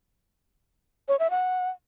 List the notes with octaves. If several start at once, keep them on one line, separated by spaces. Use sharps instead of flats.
C#5
E5
F#5